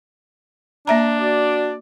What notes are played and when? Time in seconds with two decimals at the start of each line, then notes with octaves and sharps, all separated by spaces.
0.87 A#3 D4 E5 A#5
1.19 F#4 D5